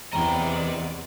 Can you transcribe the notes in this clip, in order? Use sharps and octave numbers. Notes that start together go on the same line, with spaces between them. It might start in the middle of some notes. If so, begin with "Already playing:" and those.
E2 C3 E3 D5 D#5 G5 A#5